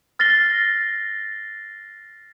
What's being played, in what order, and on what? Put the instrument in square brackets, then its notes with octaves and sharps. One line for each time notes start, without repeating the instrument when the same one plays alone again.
[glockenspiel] F6 A6 A#6 C7 G7